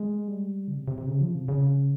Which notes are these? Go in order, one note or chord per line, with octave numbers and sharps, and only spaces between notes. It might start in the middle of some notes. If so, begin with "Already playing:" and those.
Already playing: G#3
G3
C#3
C3
C3
C3
C#3
F3
C3
C#3